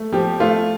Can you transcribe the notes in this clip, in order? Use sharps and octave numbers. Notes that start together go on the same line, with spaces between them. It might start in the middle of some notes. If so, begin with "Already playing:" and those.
Already playing: A3
F3 G4
A3 F4